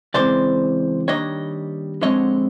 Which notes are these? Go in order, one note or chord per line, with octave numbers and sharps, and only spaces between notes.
C#3 E3 G#3 C4 C5 D5
D#3 G3 A#3 D4 C#5 D#5
D3 F3 G#3 C4 C#5 D#5